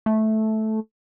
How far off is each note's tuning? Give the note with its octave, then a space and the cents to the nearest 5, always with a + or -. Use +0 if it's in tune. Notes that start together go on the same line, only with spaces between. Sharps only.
A3 -10